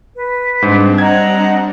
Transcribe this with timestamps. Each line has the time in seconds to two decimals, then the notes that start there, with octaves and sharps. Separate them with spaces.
0.14 B4
0.62 G#2 G3 C4 D4
0.98 D#5 F#5 A#5 G#6